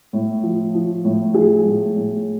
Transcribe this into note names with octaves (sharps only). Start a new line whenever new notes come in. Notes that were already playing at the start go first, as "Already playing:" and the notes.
A2
F3
F3
A2
F3 G#4
A2
A2